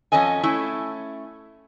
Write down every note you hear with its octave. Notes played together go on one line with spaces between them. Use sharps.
F2 C#4 A4 D#5 G#5
A3 C#4 E4